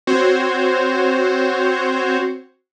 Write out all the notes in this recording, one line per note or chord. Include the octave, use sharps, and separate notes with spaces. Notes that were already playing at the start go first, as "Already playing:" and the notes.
C4 F#4 C5 C#5